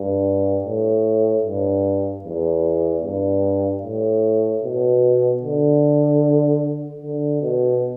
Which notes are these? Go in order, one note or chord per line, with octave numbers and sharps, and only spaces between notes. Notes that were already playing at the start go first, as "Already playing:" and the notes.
Already playing: G2
A2
G2
E2
G2
A2
B2
D3
D3
B2